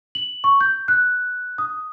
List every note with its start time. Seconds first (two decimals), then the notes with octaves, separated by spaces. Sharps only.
0.15 F#7
0.44 C#6
0.61 G6
0.88 F#6
1.58 D#6